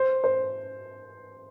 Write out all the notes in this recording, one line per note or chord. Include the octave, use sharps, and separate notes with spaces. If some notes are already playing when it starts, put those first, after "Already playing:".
Already playing: C5
C5